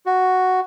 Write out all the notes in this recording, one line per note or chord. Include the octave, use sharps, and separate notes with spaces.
F#4